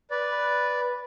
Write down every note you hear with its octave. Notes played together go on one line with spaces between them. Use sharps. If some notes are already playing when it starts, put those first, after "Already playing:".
B4 D5